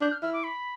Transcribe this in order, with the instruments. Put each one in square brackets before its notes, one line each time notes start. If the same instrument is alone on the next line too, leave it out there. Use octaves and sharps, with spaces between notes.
[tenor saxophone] D4 [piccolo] G6
[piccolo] F6
[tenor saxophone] E4 [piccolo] F6
[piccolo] D6
B5